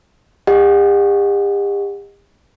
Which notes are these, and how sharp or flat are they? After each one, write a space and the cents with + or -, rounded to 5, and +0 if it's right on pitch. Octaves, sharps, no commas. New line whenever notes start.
G4 +40 D#5 -5 F#5 -15